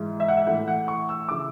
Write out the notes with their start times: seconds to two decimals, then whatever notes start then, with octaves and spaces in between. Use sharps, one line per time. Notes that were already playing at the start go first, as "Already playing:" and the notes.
Already playing: G#2 E3
0.20 E5
0.28 F#5
0.37 E5
0.47 A2 E3 F#5
0.68 F#5
0.88 C#6
1.09 E6
1.29 C#3 E3 D6